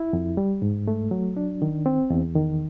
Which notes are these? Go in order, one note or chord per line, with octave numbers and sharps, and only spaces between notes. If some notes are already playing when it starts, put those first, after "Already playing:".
Already playing: E4
F2
G3
G#2
A3
F#3
D4
D#3
C4
E2
D#3